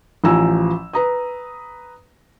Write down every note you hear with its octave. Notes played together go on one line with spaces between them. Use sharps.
A1 F3 G#5 A#5 E6
B4 A#5 D#6